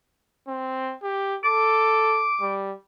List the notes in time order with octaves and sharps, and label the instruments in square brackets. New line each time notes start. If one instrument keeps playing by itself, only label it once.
[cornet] C4
G4
[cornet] A4 [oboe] D6
[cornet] G3